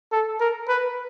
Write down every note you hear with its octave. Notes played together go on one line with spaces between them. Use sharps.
A4
A#4
B4